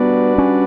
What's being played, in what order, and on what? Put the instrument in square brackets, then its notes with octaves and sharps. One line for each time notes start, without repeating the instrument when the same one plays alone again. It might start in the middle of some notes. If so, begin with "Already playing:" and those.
Already playing: [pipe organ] G3 D4 F#4 B4 D5 [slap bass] B3
[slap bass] C#4